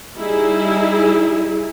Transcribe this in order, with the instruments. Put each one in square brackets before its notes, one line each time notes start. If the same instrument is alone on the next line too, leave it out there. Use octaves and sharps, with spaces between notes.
[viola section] G3 D#4 E4 G#4